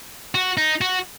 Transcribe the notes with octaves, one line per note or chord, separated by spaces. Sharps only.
F#4
D#4
F#4